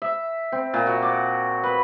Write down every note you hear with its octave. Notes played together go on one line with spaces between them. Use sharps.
E5
C4
A#2
F#4
D6
B4